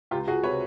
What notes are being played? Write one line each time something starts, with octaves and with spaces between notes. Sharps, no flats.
C#2 F4 G4
C#2 F#4 G#4
C3 B4 C#5